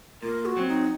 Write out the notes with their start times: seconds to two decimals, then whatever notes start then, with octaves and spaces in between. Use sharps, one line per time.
0.23 A#2 A#4
0.45 F#4
0.57 F#3 C4
0.68 D#4